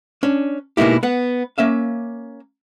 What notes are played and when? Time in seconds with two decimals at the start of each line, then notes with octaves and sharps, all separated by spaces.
0.23 C#4 D4
0.77 B2 G#3 A#3 D#4 E4 G4
1.03 B3 F#5
1.58 A#3 C#4 E5 F5